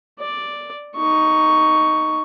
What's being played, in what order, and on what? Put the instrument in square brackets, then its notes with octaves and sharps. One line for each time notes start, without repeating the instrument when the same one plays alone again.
[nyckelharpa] D5
D#4 C#6